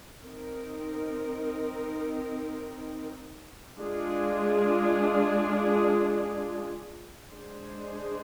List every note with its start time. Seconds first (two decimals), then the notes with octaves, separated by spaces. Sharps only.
0.24 C4 D#4 A#4
3.79 G#3 D4 F4 G#4
7.33 G#3 D4 G#4 C5